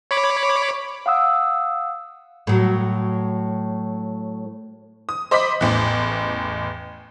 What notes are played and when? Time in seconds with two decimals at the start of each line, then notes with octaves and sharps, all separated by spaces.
0.11 C#5 B5 D6
1.06 F5 F#5 D#6 E6
2.47 A2 F#3
5.09 D#6
5.31 C5 D#5 B5 D6 D#6 B6
5.61 A1 E2